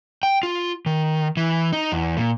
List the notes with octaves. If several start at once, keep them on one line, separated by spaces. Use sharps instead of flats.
G5
F4
D#3
E3
D#4
E2
A#2